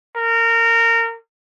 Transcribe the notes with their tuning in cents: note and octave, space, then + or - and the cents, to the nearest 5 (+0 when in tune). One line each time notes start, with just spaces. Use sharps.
A#4 -20